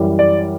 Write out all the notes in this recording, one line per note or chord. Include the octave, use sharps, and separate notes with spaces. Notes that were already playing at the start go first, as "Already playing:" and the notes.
Already playing: F#2 E3 G3
D5